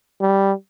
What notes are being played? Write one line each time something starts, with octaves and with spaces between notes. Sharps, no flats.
G3